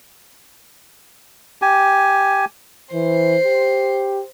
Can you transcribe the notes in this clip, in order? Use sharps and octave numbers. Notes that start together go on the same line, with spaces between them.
G4 G#5
E3 C5
G4